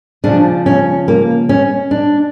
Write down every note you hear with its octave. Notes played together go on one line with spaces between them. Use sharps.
C#3 F3 D4
C#4
A#3
C#4
D4